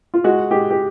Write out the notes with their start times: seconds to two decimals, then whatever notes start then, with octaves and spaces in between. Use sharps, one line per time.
0.14 F4
0.24 G#3 F#4
0.51 G#3 G4
0.71 G4